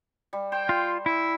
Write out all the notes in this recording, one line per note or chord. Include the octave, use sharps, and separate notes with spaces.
G3
C5 G5
F4
E4 E5